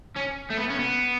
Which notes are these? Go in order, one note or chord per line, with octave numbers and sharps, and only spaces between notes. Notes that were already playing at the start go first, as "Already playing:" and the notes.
C#4
A3
B3
C#4
B3